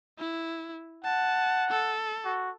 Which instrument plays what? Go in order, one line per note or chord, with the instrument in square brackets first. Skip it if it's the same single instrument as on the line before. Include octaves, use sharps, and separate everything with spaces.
[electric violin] E4
[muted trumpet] F#5 [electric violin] A5
[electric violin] A4
[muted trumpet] F#4